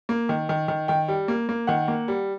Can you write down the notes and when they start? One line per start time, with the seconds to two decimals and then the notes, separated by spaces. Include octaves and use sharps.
0.09 A#3
0.29 D#3
0.49 D#3
0.68 D#3
0.88 D#3 G5
1.08 G3
1.28 A#3
1.49 A#3
1.67 D#3 F#5
1.88 A#3
2.08 G3